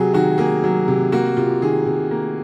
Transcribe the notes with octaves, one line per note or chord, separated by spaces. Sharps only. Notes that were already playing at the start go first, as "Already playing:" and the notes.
Already playing: C3 F#3 F#4 G#4
D#3 F#4
A#3 G#4
F#3
C3
A#3 F#4
C3 F4
D#3 G#4
C3
A#3